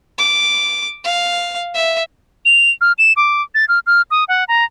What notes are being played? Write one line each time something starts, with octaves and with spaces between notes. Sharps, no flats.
D6
F5
E5
F7
F6
E7
D6
A6
F6
F6
D#6
F#5
A#5